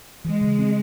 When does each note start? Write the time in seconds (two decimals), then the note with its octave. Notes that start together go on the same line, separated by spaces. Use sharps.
0.25 E3 G#3
0.41 C#3
0.59 C4